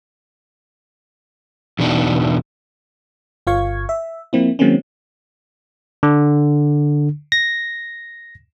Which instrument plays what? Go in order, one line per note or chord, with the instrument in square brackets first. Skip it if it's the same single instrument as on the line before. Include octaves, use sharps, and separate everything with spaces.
[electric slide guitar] E2 B2 D4 D#4
[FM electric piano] G1 F4 F5 C#6 G#6
E5
F3 A#3 C4 E4
D#3 F#3 G#3 A#3 C4 C#4
[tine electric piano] D3
A#6